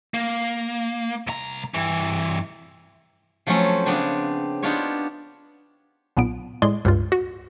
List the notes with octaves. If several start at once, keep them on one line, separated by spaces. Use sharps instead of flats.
A#3
C2 A#5
G2 E3
F3 F#3 A3 C4 C#4
C#3 B3 C4 D4 G#5
B3 D4 D#4 F4 G4 C#5
B1 A#2 B3 D7
A2 G#3 D5 C6
C#2 G2 F4
F#4